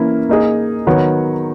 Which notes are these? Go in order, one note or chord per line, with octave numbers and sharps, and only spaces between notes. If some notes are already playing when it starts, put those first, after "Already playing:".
Already playing: E3 A#3 C#4 E4
A#3 D#4 G#4
D#3 F#3 B3 F#4 C#5